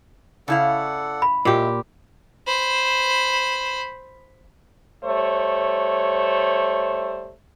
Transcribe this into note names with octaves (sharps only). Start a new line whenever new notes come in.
C#3 E4 A4 D5 F5 F#5
B5
A#2 G#3 E4 G4
C5 B5
G3 A3 C5 C#5